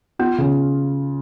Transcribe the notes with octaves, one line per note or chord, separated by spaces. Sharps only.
B3 F4
C#3